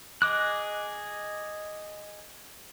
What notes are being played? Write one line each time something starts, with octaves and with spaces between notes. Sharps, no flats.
G#4 D#5 D6 F#6